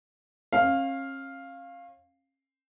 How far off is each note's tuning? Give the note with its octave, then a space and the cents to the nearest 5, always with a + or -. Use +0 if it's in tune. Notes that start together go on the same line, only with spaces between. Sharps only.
C#4 -40 F5 +0